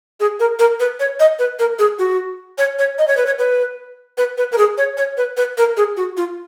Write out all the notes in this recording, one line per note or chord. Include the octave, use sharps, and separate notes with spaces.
G#4
A#4
A#4
B4
C#5
D#5
B4
A#4
G#4
F#4
C#5
C#5
D#5
C#5
B4
C#5
B4
B4
B4
A#4
G#4
C#5
C#5
B4
B4
A#4
G#4
F#4
F4